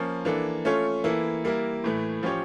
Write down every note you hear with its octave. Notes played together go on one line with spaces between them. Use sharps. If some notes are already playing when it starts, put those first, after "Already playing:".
Already playing: F3 A#3 C#4 F4
E3 A#3 D4 A4
A3 C#4 F4 A4 C#5
E3 A#3 E4 A4
G3 A#3 E4 A#4
A2 E3 A3
F3 C#4 G4 C#5